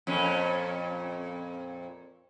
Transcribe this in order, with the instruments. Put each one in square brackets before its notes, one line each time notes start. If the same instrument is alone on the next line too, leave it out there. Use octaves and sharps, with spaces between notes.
[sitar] F2 A#2 C#4